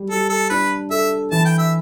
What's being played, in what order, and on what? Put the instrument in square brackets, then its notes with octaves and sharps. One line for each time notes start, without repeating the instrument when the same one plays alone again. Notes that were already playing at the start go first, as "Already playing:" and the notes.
Already playing: [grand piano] G3
[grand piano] G3 [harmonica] A4
[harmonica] A4
[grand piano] D4 [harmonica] B4
[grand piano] A4 [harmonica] E5
[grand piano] E3 [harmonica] A5
[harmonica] G5
E5